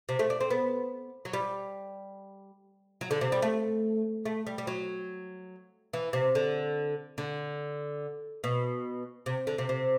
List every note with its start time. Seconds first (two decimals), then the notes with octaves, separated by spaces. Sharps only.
0.09 C3
0.19 A3
0.30 D4
0.41 C4
0.50 B3
1.25 F#3
1.33 G3
3.01 F#3
3.11 D3
3.21 C3
3.32 G3
3.42 A3
4.25 A3
4.47 G3
4.58 G3
4.67 F#3
5.93 E3
6.13 C3
6.35 D3
7.18 D3
8.44 B2
9.26 C3
9.47 D3
9.58 C3
9.69 C3